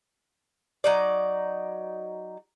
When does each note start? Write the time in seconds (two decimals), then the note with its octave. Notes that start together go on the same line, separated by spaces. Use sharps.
0.84 F#3 D#4 D5